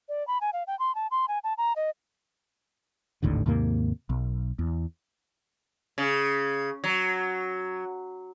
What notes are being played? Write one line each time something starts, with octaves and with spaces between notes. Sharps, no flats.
D5
B5
G#5
F5
G5
C6
A5
C6
G#5
A5
A#5
D#5
G#1 D#2 A2 D3
D#2 G#2 C3 A#3
B1
E2
C#3
F#3